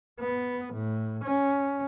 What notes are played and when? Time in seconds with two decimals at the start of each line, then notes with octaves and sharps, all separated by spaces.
0.20 B3
0.73 A2
1.24 C#4